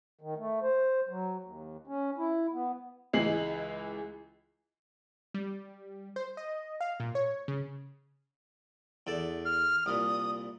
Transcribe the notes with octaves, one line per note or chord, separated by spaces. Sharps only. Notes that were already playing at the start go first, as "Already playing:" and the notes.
D#3
A3
C5
F#3
D#2
C#4
E4
B3
C#2 E3 G#3 G#4 C7 F#7
G3
C5
D#5
F5
A#2
C#5
C#3
E2 A4 D5
F6
C2 A#2 D#6